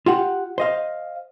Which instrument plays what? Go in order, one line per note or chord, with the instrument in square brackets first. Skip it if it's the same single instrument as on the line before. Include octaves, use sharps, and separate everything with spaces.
[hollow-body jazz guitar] F4 G4 F#5
C5 D#5 F5